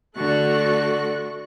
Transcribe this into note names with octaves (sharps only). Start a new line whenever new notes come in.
D3 A3 F#4 A4 C#6 F#6